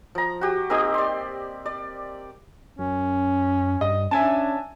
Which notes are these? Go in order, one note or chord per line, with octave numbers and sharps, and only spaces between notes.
F3 A#5
F#4 G4
A#3 C4 D#4 G4
D5 C6
D5
F#2 C#4
G2 D#5
C#4 D4 E5 G#5 A5